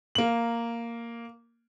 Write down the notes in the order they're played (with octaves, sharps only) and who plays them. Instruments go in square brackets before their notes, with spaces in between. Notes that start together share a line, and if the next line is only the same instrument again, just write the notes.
[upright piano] A#3 F#7